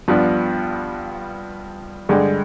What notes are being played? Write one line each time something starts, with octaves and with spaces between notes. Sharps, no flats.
G2 F3 B3 D4
G2 D3 G#3